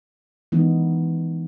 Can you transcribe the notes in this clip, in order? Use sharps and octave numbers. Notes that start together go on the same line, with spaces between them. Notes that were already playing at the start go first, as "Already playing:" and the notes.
E3 G#3 B3 D#4